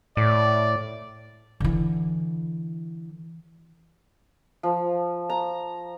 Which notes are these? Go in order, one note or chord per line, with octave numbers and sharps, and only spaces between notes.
A2 D5
D3 E3
F3
A#5